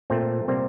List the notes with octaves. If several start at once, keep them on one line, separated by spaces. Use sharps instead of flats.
A#2 A3 C4
C3 G3 A#3 C4